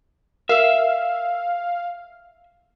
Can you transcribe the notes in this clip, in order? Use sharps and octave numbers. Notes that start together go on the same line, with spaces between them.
A#4 E5 F5